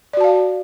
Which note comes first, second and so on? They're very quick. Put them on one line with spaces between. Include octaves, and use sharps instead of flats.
D5 F#4 A5 F5